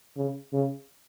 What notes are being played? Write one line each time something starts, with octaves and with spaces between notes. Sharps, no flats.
C#3
C#3